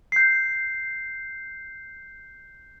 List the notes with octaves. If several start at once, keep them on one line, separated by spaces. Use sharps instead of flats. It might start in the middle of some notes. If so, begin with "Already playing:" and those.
G6 C7